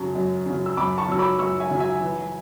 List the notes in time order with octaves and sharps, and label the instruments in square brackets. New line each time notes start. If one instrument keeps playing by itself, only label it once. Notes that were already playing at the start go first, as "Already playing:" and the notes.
Already playing: [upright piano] F#2 C#3 F#3 [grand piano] A5
[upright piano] F#2
C#3 F#3
[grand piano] E6
[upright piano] F#2 [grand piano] B5 D6
[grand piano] A5 C#6
[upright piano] C#3 F#3 [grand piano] E6
[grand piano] B5 D6
[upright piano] F#2 [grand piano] C#6 E6
[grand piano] E5 G#5
[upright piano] C#3 F#3
[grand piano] E5 G#5
[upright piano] E3